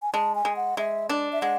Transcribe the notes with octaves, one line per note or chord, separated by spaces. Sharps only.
G#5
G#3 A5
G#5
G#3
F#5
G#3 E5
D4 D5
E5
G#3 F#5